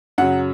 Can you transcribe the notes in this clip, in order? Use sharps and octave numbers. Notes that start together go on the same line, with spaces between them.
F#2 C#3 F#3 F#5